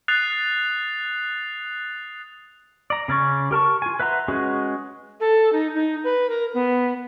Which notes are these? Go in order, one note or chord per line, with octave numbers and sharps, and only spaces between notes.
D#6 F#6 A6 C7 F7
D5 A#5
C#3 C#4 D5 C#6
G4 A#4 A5 C#6
F4 G#5
B4 E5 F#5 A#5 C6
G#3 C#4 F#4 G#4 B4
A4
D#4
D#4
B4
A#4
B3